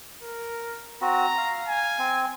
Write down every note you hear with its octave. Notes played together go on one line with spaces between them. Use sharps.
A#4
C4 F#4 A#5
F5
G#5
C4